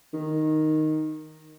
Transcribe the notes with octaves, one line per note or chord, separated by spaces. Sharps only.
D#3